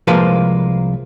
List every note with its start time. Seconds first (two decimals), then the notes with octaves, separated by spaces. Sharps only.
0.07 C2 F3 G#3 A#3 B4 F5